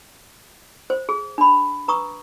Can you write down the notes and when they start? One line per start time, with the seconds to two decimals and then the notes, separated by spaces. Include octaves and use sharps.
0.90 C5
1.09 G#4
1.38 D4 B5
1.88 B4 A#5 C#6 D#6